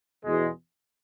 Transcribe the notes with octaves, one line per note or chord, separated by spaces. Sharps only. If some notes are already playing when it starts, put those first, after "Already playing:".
E2 B2 G#3